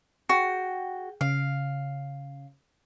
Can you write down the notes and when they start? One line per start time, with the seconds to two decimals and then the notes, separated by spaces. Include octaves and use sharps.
0.29 F#4 G#4 G5
1.21 C#3 F5